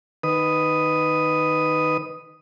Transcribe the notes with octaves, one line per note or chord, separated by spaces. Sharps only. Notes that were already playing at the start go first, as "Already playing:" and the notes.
D#3 B4 D#6